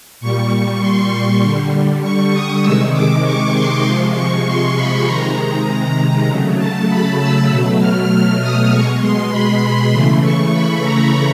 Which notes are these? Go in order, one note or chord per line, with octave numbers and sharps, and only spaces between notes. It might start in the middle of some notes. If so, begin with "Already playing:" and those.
A#2 G3 C#6
C6
C6
D3 G3
C#6
D#6
C3 D#3 G#3 E6
D6
C#6
C6
C3 F3 G#3 C6
C#6
C6
B5
C3 D#3 G#3 A#5
A#5
C#3 F#3 A3
A5
B5
E6
B2 F#3 A3
F6
F6
D#6
B2 G#3 C#6
C6
B5
B5
C#3 E3 A3 C6
C#6
B5
A#5